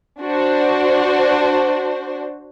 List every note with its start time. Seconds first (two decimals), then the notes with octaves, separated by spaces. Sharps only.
0.20 D4 F#4 C5